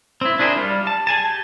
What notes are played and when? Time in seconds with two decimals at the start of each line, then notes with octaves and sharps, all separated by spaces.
0.21 C4 E4
0.39 D4 E4 G#4 A#4 C5
0.56 G3 F4
0.87 A5
1.07 G#4 G#5 A5
1.25 G4